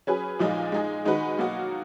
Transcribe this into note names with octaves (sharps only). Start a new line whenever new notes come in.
F#3 C#4 G#4 B4
A#2 F3 G#3 D#4
G#3 D#4 G#4
D#3 G#3 D#4 F#4 B4
B2 F#3 A#3 D#4 F#4